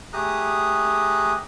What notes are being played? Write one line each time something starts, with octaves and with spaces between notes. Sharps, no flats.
A3 G4 G#4 A#5 D#6 F#6